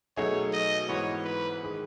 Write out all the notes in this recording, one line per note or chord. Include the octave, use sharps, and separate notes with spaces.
B2 F#3 A3 D#4 G#4 C#5
D#5
G#2 E3 B3 C#5
B4
D#3 G#3